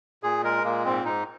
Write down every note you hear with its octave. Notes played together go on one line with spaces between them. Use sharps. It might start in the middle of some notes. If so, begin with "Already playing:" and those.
A#2 G#4
G#3 A#4
A#2 A#3
G#2 C4
G#2 D#4